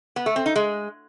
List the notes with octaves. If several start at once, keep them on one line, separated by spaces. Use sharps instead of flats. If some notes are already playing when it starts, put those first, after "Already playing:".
B3
A3
C4
D#4
G#3